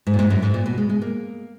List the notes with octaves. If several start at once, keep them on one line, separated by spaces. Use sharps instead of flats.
G#2
A#2
G#2
F#2
G#2
A#2
B2
G#3
G#3
A#3